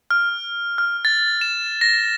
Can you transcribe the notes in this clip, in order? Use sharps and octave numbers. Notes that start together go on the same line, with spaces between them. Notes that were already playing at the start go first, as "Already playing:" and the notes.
F6
F6
A6
E7
A#6